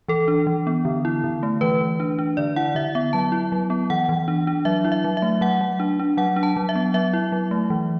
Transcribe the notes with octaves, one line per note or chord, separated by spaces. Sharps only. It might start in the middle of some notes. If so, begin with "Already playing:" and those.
E3 A4
D4
E3
B3
D3
E4
D3
A3
E3 B4
E3
D4
D4
D3 D5
E4 F#5
D3 E5
B3 E5
F#3 A5
E4
F#3
B3
E3 F#5
E3
D4
D4
F#3 E5
E4
E5
F#3
E5
A3
F#3 F#5
F#3
D4
D4
F#3 F#5
D4
A5
F#3
E5
B3
F#3 E5
E4
F#3
A3
E3